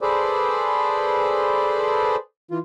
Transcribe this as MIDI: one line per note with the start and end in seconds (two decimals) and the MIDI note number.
0.01 2.16 68
0.01 2.16 69
0.01 2.16 71
0.01 2.16 72
0.01 2.16 74
2.51 2.58 52
2.51 2.58 65